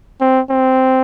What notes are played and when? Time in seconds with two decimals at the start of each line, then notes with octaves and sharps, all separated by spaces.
0.21 C4
0.50 C4